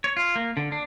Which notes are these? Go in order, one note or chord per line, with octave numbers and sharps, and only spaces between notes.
C#5
F4
A#3
D3
D4